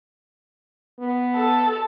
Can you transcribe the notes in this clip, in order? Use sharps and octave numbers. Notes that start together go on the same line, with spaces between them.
B3
A4